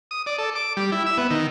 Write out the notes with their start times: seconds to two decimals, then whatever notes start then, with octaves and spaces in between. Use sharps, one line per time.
0.11 D#6
0.26 D5
0.38 A4
0.55 D6
0.77 G3
0.92 E4
1.06 E5
1.18 B3
1.31 D#3